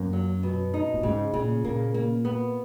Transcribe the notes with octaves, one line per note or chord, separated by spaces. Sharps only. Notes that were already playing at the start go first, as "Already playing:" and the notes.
Already playing: F#2 A#3
F#3
B2
D#4
A#2
G#2 C#3
A#2 C#3
A#2 A#3
A#3
B3